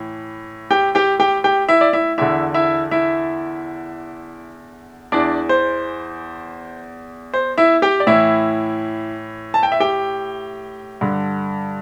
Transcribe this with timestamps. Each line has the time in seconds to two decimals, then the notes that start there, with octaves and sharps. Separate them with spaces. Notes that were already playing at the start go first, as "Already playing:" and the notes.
Already playing: A2 E3
0.71 G4 G5
0.95 G4 G5
1.20 G4 G5
1.44 G4 G5
1.69 E4 E5
1.81 D5
1.93 E4 E5
2.18 E2 D3 E4 E5
2.54 E4 E5
2.91 E4 E5
5.12 E2 E3 D4 D5
5.49 C5
7.34 C5
7.58 E4 E5
7.82 G4 G5
8.00 D5
8.07 A2 E3 E4 E5
9.54 A5
9.63 G5
9.72 E5
9.80 G4 G5
11.01 G2 D3